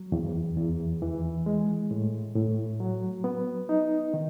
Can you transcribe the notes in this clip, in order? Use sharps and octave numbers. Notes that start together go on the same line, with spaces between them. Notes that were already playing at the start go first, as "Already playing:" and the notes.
Already playing: F#3
E2
E2
E3
G#3
A2
A2
F#3
B3
D#4
D#3